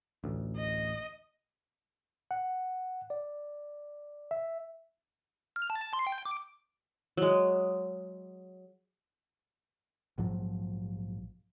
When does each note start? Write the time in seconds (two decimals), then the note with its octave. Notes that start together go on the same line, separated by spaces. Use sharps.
0.24 A1 D2
0.56 D#5
2.31 F#5
3.10 D5
4.31 E5
5.56 F6
5.70 A5
5.93 C6
6.07 G5
6.26 D6
7.17 F#3 G#3
10.18 A#1 G#2 F3 F#3